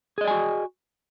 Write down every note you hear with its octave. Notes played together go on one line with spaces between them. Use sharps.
F#4 G#4 D5 D#5 G#5